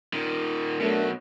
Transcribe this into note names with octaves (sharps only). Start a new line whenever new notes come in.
A#2 D#3
B2 F#3 A3 D4 A#4